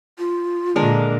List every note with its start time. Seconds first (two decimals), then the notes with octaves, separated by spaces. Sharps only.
0.19 F4
0.76 A#2 D3 G#3 D4 A#4